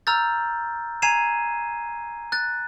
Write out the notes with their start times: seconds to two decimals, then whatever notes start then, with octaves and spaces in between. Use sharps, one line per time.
0.07 A#5 E6 F6 G6 A6
1.02 G#5 A#5 G#6 C7 D#7 E7
2.32 F#6 A6